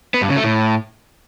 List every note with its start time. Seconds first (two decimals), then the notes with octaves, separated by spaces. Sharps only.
0.14 B3
0.22 G2
0.29 C#3
0.36 A3
0.44 A2